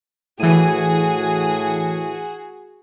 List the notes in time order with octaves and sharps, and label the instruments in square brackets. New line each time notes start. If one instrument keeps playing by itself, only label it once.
[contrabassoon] A2 [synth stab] E3 D#7 [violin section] F#4 G#4